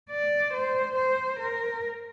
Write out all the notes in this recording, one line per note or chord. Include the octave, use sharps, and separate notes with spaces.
D5
C5
C5
A#4